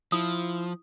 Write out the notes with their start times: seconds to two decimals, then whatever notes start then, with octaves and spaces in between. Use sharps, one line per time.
0.12 F3 E4 D#6